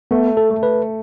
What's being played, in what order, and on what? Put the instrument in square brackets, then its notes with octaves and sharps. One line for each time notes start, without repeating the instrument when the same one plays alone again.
[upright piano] A3 [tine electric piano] B3
[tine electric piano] A4
[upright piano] A3
[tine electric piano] B4